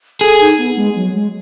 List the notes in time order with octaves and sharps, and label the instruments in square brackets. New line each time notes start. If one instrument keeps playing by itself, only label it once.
[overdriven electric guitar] G#4 [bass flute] A4
[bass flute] D#4
B3
G#3
F#3
G#3